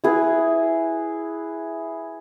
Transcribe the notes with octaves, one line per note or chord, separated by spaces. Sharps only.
E4 G#4 B4